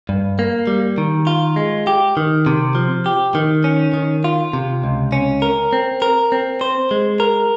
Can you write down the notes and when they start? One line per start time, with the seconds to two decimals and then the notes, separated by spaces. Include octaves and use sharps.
0.09 G2
0.39 A#3
0.67 G3
0.98 D#3
1.27 F4
1.56 G#3
1.87 G4
2.17 D#3
2.46 C3
2.75 F3
3.06 G4
3.35 D#3
3.64 C#4
3.94 D#3
4.24 F4
4.53 C3
4.84 C#2
5.12 C#4
5.42 A#4
5.73 C4
6.02 A#4
6.32 C4
6.61 C5
6.91 G#3
7.20 A#4